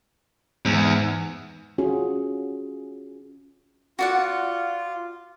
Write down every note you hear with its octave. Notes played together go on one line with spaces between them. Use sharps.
E2 G#2
C#4 F4 F#4 G#4
F4 F#4 D5 F#5